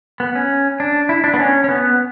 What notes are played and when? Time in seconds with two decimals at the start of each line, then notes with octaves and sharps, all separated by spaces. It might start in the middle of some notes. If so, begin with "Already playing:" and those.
0.20 B3
0.35 C#4
0.80 D4
1.09 E4
1.24 D4
1.34 B3
1.39 C#4
1.64 C#4
1.69 B3